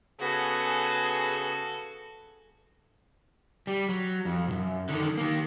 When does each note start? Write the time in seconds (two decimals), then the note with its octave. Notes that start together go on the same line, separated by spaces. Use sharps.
0.20 C#3 B3 F#4 G#4 A4
3.67 G3
3.89 F#3
4.25 F2
4.48 B1 F#2
4.89 D3 D#3
5.17 D#3 A#3